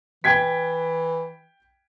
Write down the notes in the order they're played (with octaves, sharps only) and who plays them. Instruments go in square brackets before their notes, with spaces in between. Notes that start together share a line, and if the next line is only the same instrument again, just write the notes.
[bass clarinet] E3 [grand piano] G5 G#6 B6